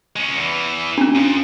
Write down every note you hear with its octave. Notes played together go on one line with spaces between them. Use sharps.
G#3 C#4
E2 E3
C#4 D4
F2